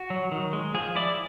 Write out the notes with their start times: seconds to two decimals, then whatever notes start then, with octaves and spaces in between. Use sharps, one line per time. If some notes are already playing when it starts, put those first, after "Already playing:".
Already playing: F#4
0.10 F#3
0.32 D#3
0.53 G#3
0.75 F3 G#4
0.95 E4 D5